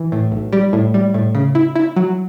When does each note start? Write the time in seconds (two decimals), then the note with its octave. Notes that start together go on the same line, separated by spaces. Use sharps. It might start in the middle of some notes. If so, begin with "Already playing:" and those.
Already playing: E3
0.12 A2
0.32 B1
0.52 G3
0.73 A2
0.94 G3
1.14 A2
1.35 C#3
1.55 E4
1.76 E4
1.96 F#3